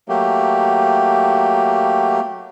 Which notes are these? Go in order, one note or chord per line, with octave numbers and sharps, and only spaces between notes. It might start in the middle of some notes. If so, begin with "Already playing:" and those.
F#3 A3 A#3 G4